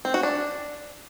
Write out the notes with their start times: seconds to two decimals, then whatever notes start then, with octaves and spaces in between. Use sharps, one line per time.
0.05 C4
0.14 F#4
0.23 D4